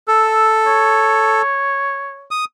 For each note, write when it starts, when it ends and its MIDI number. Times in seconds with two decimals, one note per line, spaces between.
0.08 1.42 69
0.08 0.52 88
0.67 2.28 73
2.31 2.45 87